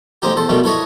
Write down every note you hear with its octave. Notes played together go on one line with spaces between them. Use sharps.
A1 G#3 C4 D#4 G4
E2 A4 C5
B2 D#3 G3 A3
E4 A4 B4 C#5 D#5